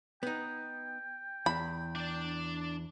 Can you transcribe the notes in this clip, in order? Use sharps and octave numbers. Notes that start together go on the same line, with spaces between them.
B3 D#4 G5
E2 B5
D4 D5